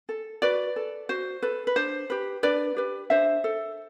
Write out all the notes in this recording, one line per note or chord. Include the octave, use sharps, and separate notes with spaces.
A4
F#4 B4 D5
A4
F#4 C5
A4 B4
B4
D4 C5
G4 B4
D4 B4 D5
G4 B4
D4 C5 E5
A4